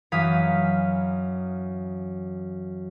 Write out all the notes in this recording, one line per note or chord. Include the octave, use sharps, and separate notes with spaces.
F#2 E3 F5 D#6 B6